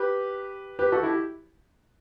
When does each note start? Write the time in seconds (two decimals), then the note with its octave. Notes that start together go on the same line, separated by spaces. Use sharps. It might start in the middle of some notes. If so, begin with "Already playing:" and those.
Already playing: G4 B4
0.79 G4 B4
0.92 F#4 A4
1.03 E4 G4